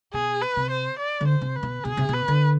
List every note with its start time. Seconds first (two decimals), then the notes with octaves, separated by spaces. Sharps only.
0.14 B2 G#4
0.42 B4
0.57 C3
0.70 C5
0.99 D5
1.21 D3
1.28 C5
1.41 C3
1.56 B4
1.63 B2
1.84 B2 G#4
1.97 C3
2.09 B2 B4
2.28 D3